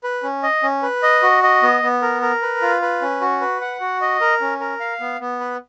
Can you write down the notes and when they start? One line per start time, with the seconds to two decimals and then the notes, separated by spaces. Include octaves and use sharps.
0.04 B4
0.23 C#4
0.43 D#5
0.63 C#4
0.83 B4
1.03 D#5
1.23 F#4
1.43 D#5
1.63 B3
1.83 B3
2.02 A#4
2.22 A#4
2.42 B4
2.62 F4
2.82 B4
3.01 C#4
3.21 F#4
3.41 B4
3.61 F#5
3.81 F#4
4.01 D#5
4.21 A#4
4.41 C#4
4.60 A#4
4.80 F5
5.00 B3
5.20 B3
5.40 B4